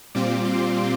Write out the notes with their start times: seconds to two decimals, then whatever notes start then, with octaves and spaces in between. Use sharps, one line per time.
0.15 A#2 G3 C4 F4 D6
0.45 C6